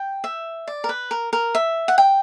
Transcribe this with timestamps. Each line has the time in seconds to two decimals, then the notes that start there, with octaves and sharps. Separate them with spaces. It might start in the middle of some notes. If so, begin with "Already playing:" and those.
Already playing: G5
0.24 E5
0.68 D5
0.84 A#4
0.89 B4
1.11 A#4
1.33 A#4
1.55 E5
1.88 F#5
1.98 G5